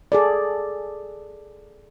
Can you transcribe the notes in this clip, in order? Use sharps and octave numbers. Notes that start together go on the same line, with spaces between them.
G#4 A4 D5